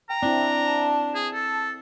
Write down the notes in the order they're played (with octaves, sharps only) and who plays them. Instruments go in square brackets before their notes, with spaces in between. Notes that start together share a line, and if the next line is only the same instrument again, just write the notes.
[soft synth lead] G5 [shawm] A#5
[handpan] C4 E4 [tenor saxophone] D4
[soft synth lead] A5
[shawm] G#4
A4